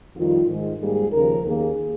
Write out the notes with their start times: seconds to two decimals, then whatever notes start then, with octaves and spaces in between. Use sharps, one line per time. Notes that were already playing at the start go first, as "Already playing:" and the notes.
0.15 F2 D#3 G3 F4
0.48 G#2 D#3 G#3
0.80 G#2 G3 A#3 G#4
1.12 D#2 C#3 F3 A#4
1.45 D#2 D#3 A#3 G#4